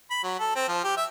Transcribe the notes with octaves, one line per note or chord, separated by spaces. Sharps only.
B5
F#3
A4
C4
F3
G4
E5